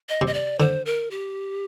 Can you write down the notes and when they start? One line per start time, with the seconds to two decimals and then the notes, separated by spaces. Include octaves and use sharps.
0.09 D#5
0.21 C3
0.27 D#5
0.34 D5
0.59 D3 C5
0.86 A#4
1.11 G4